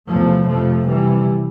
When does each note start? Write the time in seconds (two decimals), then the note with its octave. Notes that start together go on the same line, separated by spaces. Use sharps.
0.08 E2 C3 F3 A3
0.47 F2 C3 F3 A3
0.87 C3 E3 G3